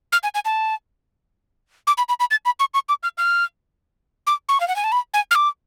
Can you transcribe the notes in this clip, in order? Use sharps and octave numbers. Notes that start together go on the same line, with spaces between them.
F6
G#5
G#5
A5
D6
B5
B5
B5
A6
B5
C#6
C#6
D6
F6
F6
D6
C#6
F5
F#5
G#5
A5
B5
G#5
F6
D6